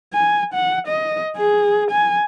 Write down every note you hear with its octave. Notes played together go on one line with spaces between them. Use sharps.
G#5
F#5
D#5
G#4
G#5